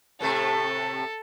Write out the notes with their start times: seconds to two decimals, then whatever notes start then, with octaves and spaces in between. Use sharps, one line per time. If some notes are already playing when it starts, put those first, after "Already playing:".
0.21 A2 C3 A3 A4